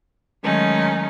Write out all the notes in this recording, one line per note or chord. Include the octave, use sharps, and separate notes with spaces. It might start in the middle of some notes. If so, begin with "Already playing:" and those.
D#3 F#3 G#3 A3 C#4 D#4